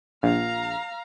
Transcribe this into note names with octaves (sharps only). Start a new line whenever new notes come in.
A#1 F5 A#5